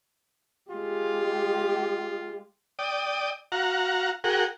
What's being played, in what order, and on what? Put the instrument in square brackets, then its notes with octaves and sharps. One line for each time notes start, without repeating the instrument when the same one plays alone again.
[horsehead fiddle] G#3 G4 [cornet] F4
[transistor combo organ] D5 G5 D#6
F#4 F5 F#5 A#5
F#4 G#4 A#4 F#5 G5